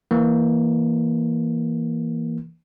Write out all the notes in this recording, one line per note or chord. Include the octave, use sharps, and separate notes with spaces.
E3 A#3